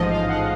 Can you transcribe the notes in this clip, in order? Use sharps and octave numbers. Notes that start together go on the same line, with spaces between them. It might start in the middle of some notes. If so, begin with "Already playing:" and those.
Already playing: A1 G#2 F3 D#5
F5
F#5